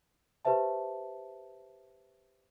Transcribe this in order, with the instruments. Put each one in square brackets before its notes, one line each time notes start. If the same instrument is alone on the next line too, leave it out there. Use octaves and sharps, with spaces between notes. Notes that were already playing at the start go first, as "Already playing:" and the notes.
[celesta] G4 B4 C5 E5 A5